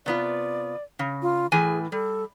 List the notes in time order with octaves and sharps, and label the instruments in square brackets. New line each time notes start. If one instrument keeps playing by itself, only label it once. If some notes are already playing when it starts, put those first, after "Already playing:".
[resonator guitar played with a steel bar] C3 B3 F4 [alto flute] D5
[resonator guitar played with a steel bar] C#3
[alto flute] F4
[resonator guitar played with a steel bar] A2 E3 G#5 [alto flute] G#4
[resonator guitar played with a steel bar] G3 [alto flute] A4